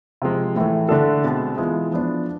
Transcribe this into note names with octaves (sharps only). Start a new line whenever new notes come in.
C3 F3 G#3
A2 E3 A3
D3 A3 D4 A4
B2 G#3 C4
E3 G#3 B3 F4
F3 B3 D4